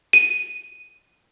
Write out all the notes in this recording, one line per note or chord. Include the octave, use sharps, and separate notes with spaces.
D#7